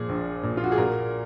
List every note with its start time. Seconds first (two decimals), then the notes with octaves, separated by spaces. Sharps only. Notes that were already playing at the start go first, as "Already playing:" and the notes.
Already playing: A#2 F3 G#4
0.09 A#1
0.43 A#2
0.57 F4
0.64 F#4
0.72 G#4
0.78 A#2 A#4